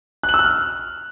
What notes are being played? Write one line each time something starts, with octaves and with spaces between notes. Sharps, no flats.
F#6
F#7
E6
F#6
F6